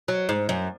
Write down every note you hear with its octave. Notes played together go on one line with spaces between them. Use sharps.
F#3
G#2
F#2